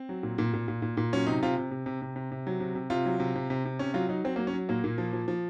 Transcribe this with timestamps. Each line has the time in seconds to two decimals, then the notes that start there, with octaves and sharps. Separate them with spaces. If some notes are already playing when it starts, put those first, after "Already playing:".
Already playing: C4
0.09 F#3
0.23 A#2
0.38 A#2
0.54 A#2
0.68 A#2
0.82 A#2
0.97 A#2
1.13 F#3 C#4
1.27 C3 D#4
1.43 C3 F4
1.58 C3
1.71 C3
1.86 C3
2.02 C3
2.16 C3
2.32 C3
2.47 F#3
2.60 C3
2.75 C3
2.90 C3 F4
3.06 F#3
3.20 C3
3.35 C3
3.50 C3
3.65 C3
3.79 C3 C#4
3.94 F#3 F4
4.09 F#3 D#4
4.24 F#3 C4
4.36 A#3
4.39 F#3
4.47 C#4
4.53 F#3
4.69 A#2 A#3
4.84 A#2
4.98 F3
5.13 F3
5.28 F3